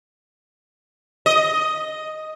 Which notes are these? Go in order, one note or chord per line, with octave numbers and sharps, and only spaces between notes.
D#5